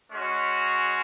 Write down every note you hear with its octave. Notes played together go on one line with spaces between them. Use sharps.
G#3 C#4 F#4